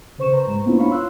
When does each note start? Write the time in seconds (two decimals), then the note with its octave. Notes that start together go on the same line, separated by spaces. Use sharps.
0.18 C#3 C5 C#6 E7
0.31 B4 C5 A#5
0.46 G#2 G#3
0.65 A#3 B3 C#4 D4 E4 F4
0.78 C#5 F5 B5 C#6
0.90 C6 E6 F#6